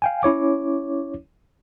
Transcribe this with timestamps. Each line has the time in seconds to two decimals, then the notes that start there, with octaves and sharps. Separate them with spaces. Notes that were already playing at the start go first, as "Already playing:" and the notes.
0.02 F5 G5 G#5
0.23 C#4 E4 C#5 D6